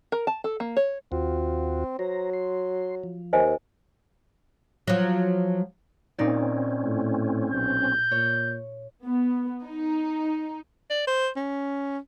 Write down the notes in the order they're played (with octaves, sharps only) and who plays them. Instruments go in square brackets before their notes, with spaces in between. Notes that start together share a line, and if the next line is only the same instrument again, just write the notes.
[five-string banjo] A#4
A5
A4
A#3
C#5
[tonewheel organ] D#2 F4 F#4 [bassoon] C4
[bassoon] F#3 [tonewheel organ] C5 A#5
[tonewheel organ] C6
F3
[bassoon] D#2 [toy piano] C5 D#5 G#5
[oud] F3 F#3
[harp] A#2 D#4 D5 [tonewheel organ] C4 C#4
[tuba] A2
[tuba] B1 [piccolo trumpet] G6
[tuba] A#2 [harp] C#5
[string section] B3
D#4
[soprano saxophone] D5
C5
C#4